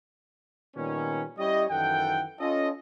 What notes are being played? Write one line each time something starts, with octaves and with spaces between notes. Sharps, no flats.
A#2 D#3 G3 B3 C#4
G3 C#4 E4 G4 C#5 D#5
F#2 D#3 E3 A4 F#5 G5
C#4 F4 A4 D#5